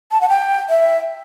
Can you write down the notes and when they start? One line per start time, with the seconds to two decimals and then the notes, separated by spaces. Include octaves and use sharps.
0.12 A5
0.21 F#5
0.29 G5
0.70 E5